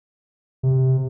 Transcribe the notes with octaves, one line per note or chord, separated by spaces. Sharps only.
C3